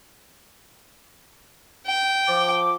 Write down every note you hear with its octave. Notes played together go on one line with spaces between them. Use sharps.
G5
F3 D6